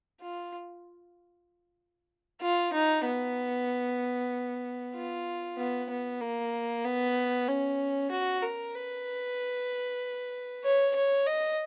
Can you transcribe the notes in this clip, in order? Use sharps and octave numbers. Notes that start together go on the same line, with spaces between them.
F4
F4
D#4
B3
F4
B3
B3
A#3
B3
C#4
F#4
A#4
B4
C#5
C#5
D#5